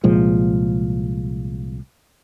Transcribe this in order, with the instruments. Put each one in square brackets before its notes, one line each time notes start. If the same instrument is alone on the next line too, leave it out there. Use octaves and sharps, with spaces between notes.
[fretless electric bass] C2 A#2 F3 G#3